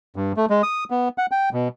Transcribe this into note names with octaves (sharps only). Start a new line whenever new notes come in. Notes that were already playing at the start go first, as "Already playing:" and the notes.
G2
A3
G#3
D#6
B3
F#5
G5
B2